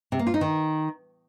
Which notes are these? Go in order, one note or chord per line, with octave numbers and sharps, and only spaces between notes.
C3
A#3
F4
D#4
D#3